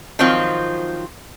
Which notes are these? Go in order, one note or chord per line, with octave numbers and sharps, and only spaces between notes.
D#3 F3 F#3 C4 F4